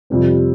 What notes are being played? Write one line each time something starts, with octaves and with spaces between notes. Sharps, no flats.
F2 C3 G3 C4